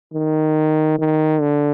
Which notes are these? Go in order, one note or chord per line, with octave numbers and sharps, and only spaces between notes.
D#3
D#3
D3